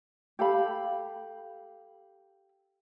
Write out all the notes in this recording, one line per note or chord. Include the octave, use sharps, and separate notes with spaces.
G4 A4 F5 B5